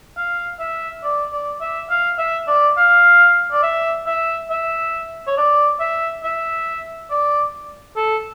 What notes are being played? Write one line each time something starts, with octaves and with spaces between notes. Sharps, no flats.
F5
E5
D5
D5
E5
F5
E5
D5
F5
D5
E5
E5
E5
C#5
D5
E5
E5
D5
A4